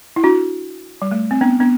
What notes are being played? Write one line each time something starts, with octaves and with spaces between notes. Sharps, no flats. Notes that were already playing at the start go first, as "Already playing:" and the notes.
E4
D4 F#4
G3
A3
C4
B3 D4
B3 D4